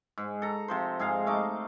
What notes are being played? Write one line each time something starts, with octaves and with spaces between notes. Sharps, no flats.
G#2
A4 A#5
C3 F3 C5
G#2 G#4 F5 A#5
A3 D#4 D6